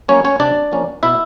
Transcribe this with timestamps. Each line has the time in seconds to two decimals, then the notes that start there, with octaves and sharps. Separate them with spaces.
0.08 F#3 A#3 C#4 C#5
0.25 C#4 C#5
0.40 C3 D4 D5
0.72 F3 A#3 C#4
1.03 B2 E4 E5